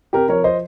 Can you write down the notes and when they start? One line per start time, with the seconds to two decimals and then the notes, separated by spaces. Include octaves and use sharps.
0.13 C3 G4 A#4
0.29 F3 A#4 C#5
0.44 C5 D#5